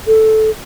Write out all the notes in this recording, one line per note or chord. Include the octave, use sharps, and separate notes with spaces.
A4